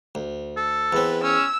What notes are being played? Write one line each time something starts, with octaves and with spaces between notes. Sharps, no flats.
D2
A4
E2 C4 B4
C#4 E6